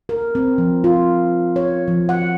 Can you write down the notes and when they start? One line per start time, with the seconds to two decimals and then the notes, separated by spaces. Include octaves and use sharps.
0.09 A#4
0.35 C4
0.58 F3
0.84 F4
1.56 C#5
1.88 F3
2.09 F#5